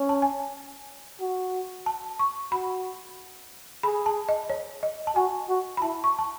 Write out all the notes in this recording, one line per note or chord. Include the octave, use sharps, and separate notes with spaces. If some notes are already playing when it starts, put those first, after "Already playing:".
Already playing: C#4
A5
G#5
F#4
A5
C#6
F#4 B5
G#4 B5
A5
D#5
C#5
D#5
A5
F#4 G#5
F#4
B5
E4 A5
C#6
A5